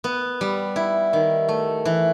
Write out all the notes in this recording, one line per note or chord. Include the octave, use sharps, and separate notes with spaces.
B3
G3
E4
D#3
A3
E3